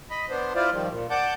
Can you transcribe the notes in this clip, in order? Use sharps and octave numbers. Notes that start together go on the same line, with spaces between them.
D#5 B5
B3 D4 C5
E4 F4 C5 D5 F5
D#3 F3 G3
A#2
D5 F#5 A5 D6 G6